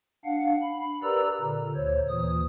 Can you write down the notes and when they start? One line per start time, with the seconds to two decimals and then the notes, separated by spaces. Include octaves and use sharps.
0.25 D4 F5 F#5
0.62 B5
1.03 G4 A#4 B4 D5 A#5 E6
1.41 A#2 D3
1.75 D2 C5 C#5
2.09 D#2 A#2 E3 D#6